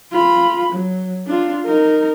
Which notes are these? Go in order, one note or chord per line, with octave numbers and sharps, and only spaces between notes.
F4 B5
F#3
D4 F4
D#4 A#4